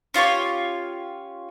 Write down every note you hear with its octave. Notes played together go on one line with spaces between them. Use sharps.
C#4 F4 G4 C#5